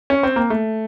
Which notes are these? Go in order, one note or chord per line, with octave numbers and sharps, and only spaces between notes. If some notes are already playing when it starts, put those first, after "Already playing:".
C#4
C4
A#3
A3